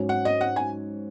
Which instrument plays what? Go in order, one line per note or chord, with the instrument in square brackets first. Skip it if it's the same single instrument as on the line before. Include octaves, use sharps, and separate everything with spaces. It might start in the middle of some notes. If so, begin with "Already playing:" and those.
Already playing: [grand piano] G#2 F#3 C#4
[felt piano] F#5
D#5
F#5
G#5